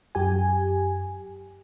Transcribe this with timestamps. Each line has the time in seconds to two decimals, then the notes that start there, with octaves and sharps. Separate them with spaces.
0.15 F#2 G4 G#5